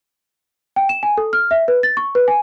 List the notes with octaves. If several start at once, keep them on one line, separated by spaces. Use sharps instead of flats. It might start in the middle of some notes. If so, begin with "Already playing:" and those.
G5
E7
G#5
A4
F6
E5
B4
A6
C#6
B4
G#5